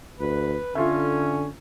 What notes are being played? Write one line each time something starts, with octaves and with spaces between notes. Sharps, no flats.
D2 B4
D3 C#4 F4 A4 E5